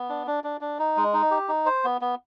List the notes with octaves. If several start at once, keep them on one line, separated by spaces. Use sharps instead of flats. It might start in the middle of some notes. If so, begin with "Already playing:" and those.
Already playing: B3
D4
D4
D4
D4
D#4
G#3
D#4
G4
D#4
C5
B3
B3